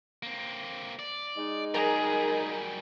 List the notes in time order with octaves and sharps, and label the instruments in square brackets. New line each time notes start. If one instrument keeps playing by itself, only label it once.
[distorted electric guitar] A#3 C4
D5
[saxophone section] G#3 D#4
[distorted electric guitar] F#3 G3 [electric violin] G#4 [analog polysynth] A#4